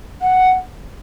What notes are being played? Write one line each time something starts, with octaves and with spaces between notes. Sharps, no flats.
F#5